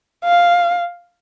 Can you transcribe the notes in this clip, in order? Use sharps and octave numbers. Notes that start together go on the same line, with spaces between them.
F5